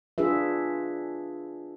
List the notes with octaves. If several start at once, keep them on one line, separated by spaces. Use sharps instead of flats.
D4 F4 G#4 B4 E5